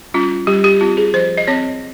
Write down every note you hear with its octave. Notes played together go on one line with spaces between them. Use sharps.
G3 C#4 F4
G3 G4
G4
C4 F4
G#4
F3 C5
D#5
C4 C#5